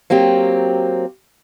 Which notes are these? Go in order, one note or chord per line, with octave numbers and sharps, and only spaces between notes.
F#3 A#3 C4 G4